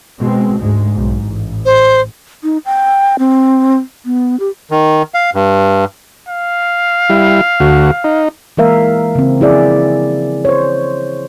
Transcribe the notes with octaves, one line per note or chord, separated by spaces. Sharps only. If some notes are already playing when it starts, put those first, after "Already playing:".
B2 G#3 C4
D2 G#2 G#3
B1 G#2
A1
C5
D#4
G5
C4
B3
G4
D#3
F5
G2
F5
G3 E4
D2 F#4
D#4
E3 G#3 A#3 A#4 E5 F5
C#3 C4
F3 E4 G#4 D5 E5
C5 C#5